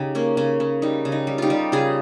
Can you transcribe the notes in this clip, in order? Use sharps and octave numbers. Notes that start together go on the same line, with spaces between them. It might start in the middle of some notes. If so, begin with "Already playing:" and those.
Already playing: C#3 D#4 G4
A#3 C#4
C#3 C#4
C#3
G3 D#4
C#3
D#4
G3
D#4 F4 G4
G3
C#3 F4 G#4